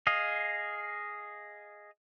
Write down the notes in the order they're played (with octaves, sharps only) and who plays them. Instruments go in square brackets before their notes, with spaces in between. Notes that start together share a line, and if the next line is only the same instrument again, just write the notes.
[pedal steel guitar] G#4 D#5 F5